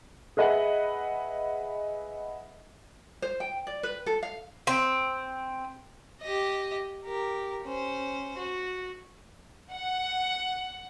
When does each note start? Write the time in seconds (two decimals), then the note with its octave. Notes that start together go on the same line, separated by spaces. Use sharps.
0.37 G#4 B4 D#5 E5 F#5
3.22 C5
3.40 G5
3.67 D5
3.83 B4
4.06 A4
4.23 F5
4.67 C4
6.21 G4 D#5
7.04 G4 A#4
7.64 C#4 C5
8.38 F#4
9.72 F#5